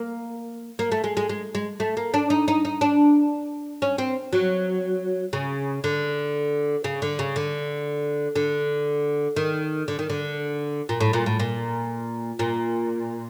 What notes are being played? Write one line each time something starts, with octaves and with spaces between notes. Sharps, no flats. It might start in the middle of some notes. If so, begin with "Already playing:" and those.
Already playing: A#3
A#3
A3
G#3
G#3
G#3
G#3
A3
A#3
D4
D#4
D#4
D#4
D4
C#4
C4
F#3
C#3
D3
C#3
D3
C#3
D3
D3
D#3
D3
D#3
D3
A#2
A2
A#2
A2
A#2
A#2